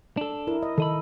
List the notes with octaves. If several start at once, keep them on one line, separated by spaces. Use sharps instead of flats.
D4 A4
E4 A#4
D#5
D#3 A4 D#5 B5